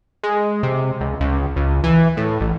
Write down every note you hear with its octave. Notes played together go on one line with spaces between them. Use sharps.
G#3
C3
C#2
C#2
C#2
E3
A2
A1